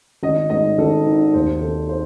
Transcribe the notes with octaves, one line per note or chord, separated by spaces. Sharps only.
G#1 D#5
G#2 D#5
G#1 A4
D#3
D#2 C5
D#3 A4
C5